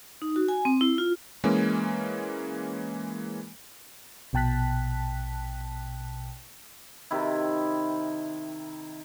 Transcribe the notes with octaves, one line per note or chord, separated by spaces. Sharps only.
D#4
F#4
G#5
C4
E4
F4
E3 G#3 A#3 C#4
A#1 B2 G5 A5 F#6 B6
C3 D#3 E4